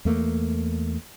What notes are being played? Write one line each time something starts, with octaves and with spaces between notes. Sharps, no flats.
E2 A3 A#3